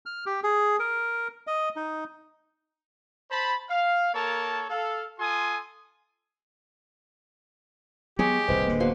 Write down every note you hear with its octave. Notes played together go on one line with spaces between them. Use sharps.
F6
G4
G#4
A#4
D#5
D#4
C5 A5 B5
F5
A#3 A4 A#4 C#5 A5
A4 F5
F4 A4 G#5 C6 D#6
F#3 G#3 B3 G4 G#4 C#5
D#1 C2 A2 B4 C5 D#5
D1 D3 A#3
B2 A#3 B4 C5 C6